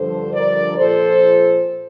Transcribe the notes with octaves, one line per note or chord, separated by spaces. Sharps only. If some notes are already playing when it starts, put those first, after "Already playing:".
Already playing: G2 D3 F3 A4 C5
A#4 D5
A#2 F3 A4 C5